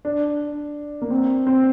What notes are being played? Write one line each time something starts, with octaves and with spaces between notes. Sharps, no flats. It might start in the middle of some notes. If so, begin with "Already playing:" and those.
D4
A#3
C4
C4